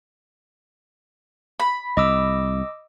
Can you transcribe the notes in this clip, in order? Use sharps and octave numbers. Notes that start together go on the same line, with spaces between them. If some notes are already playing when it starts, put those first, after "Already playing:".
B5
C2 D#5 D6 E6